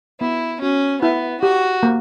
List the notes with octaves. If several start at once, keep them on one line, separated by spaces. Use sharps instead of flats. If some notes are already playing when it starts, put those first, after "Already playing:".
B3 E4
C#4 F#4
B3 E4
F#4 G4
A#3